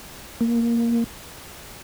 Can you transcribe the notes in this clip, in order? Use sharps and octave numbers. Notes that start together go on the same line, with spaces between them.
A#3